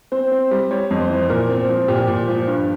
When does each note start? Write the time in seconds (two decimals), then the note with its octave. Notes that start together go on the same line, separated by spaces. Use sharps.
0.12 C4 C5
0.32 C4
0.51 G3
0.71 G3 C#5
0.91 F2
1.00 C5
1.10 E3
1.30 A#2 A#4
1.49 C4
1.69 F3
1.88 A#2 G4
2.08 A#2
2.28 F3
2.47 G2